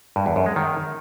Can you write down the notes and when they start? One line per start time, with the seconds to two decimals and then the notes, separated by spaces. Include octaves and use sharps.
0.16 G2
0.26 E2
0.36 F#2
0.46 G#3
0.56 D#3